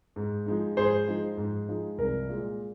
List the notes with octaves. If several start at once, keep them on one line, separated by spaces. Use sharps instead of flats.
G#2
F3 G#3 D#4
G#2 G#4 C5
F3 G#3 D#4
G#2
F3 G#3 D#4
C2 A#4
A#2 G#3